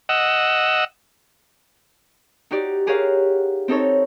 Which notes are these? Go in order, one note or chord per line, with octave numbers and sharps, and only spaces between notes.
D#5 F#5 E6
D#4 F#4 G4 D5
G4 G#4 A#4 C#5 F5 F#5
C4 D#4 A4 C#5